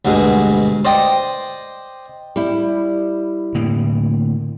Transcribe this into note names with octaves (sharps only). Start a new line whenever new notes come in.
D2 G2 B2 G#3
C5 D5 D#5 G5
G3 E4
A2 D3 A#3